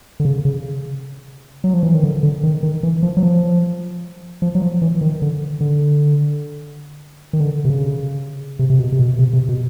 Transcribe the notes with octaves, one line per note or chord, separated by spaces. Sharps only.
D3
C#3
C#3
F#3
F3
E3
D#3
D3
D3
D#3
D#3
E3
F3
F#3
F3
F3
F#3
F3
E3
D#3
D3
D3
D#3
D3
C3
C#3
C3
C3
B2
C3
B2
C3
C3
B2